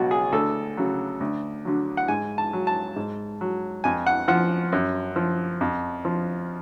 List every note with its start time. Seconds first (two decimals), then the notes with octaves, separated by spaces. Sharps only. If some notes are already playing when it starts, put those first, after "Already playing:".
Already playing: C#2 B2 F#3 F#4
0.11 G#4
0.32 D2 A4
0.77 C#3 F#3
1.20 D2
1.65 D3 F#3
1.97 F#5
2.08 G#2 G#5
2.38 A5
2.53 F#3
2.67 A5
2.96 G#2
3.41 F#3
3.84 F2 G#5
4.06 F#5
4.28 F3 F#5
4.72 F#2
5.16 F3
5.61 F2
6.05 F3